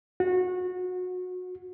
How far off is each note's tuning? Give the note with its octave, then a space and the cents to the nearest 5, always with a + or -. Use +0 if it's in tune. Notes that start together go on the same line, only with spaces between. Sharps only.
F#4 -25